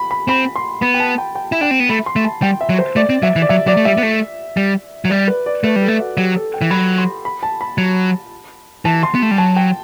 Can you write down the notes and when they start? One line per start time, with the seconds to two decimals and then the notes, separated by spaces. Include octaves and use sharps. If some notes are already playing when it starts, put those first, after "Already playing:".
Already playing: B5
0.11 B5
0.28 C4 B5
0.56 C6
0.81 B3 B5
0.94 G5
1.00 A5
1.18 G5
1.35 G5
1.52 E4
1.61 D4 G5
1.71 C4
1.80 B3
1.89 A3 B5
2.06 C6
2.16 A3
2.25 A5
2.42 G3 G5
2.61 E5
2.69 F#3
2.79 C5
2.96 A3 D5
3.10 C4
3.22 F#3 E5
3.36 E3
3.42 D5
3.49 F#3 E5
3.67 F#3 D5
3.77 A3
3.85 G3 E5
3.98 B3
4.03 A3
4.57 G3
5.05 F#3
5.10 G3 D5
5.28 B4
5.46 D5
5.64 A3 B4
5.76 G3
5.82 A4
5.88 A3
6.00 F#4
6.17 F#3 G4
6.36 A4
6.54 G5
6.61 E3
6.71 F#3 B5
6.98 C6
7.25 B5
7.43 A5
7.61 B5
7.78 F#3
8.85 E3 A5
9.03 C6
9.15 B3
9.22 A3
9.31 G3
9.38 F#3 A5
9.56 G5